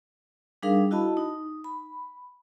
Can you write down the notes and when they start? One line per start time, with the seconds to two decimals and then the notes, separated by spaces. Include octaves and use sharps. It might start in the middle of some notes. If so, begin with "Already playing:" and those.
0.63 G3 D4 D#4 G#4 A#4 F5
0.91 E4 F#4 D#5 A5 B5
1.17 D#4
1.64 B5